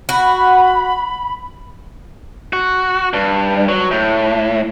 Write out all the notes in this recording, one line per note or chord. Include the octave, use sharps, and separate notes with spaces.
F#4 B5
F#4
G2
F#3
A2